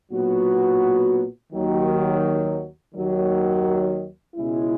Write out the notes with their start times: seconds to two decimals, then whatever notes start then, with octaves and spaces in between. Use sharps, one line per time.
0.11 B1 A#2 F#3 B3 F#4
1.53 D#2 D#3 F#3
2.94 D#2 D#3 F#3
4.35 C#2 B2 G#3 C#4 E4